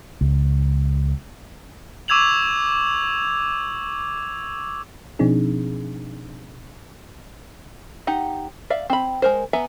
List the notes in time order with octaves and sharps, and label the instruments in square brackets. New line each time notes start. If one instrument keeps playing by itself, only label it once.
[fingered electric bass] C#2
[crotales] C#6 D6 E6 G#6 F7 F#7
[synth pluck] B2 F3 C4 D4 D#4 G#4
[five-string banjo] D#4 G4 F#5
D5 E5 F5
C4 B5
G#3 A#4 C5
B3 E5 G#5 A#5